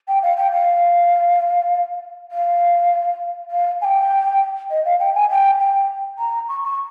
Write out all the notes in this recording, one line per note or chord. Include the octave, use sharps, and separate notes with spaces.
G5
F5
G5
F5
F5
F5
G#5
G5
D#5
F5
G5
G#5
G5
G5
A#5
C#6
C#6